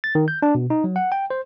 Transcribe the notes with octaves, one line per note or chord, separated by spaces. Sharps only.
A6
D#3
G6
D4
B2
D#4
F#3
F#5
G5
C5